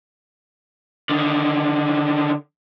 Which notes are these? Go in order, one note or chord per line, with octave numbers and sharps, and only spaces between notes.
D3 D#3